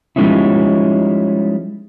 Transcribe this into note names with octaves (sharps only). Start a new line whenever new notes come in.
F3 G3 G#3 C#4 D#4 E4